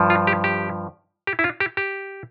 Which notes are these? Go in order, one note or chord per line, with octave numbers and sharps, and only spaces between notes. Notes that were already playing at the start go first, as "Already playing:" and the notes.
Already playing: G2 F3
F4
G4
G4
G4
E4
F4
G4
G4